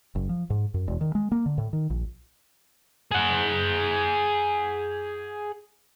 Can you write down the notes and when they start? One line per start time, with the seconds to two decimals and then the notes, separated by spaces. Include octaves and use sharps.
0.15 F#1
0.29 F3
0.50 G#2
0.74 F#2
0.88 E1
1.01 D#3
1.15 G#3
1.32 A#3
1.46 D3
1.58 A2
1.73 D#3
1.90 A#1
3.11 G#4 F#5